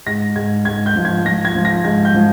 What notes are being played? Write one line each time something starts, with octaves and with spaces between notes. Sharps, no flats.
G#2 A#6
G#2 G#6
G#2 G#6
G6
F3
G#6
F3 A#6
G#6
F3
A#6
G#2 G#6
G6
F3